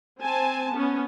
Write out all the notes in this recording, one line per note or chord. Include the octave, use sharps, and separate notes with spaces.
C4 G#5 A5
B3 C#4